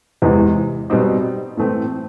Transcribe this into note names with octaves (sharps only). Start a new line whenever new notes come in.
E2 C3 E3 G#3
B2 G3 C4 D#4
A2 E3 A3 C4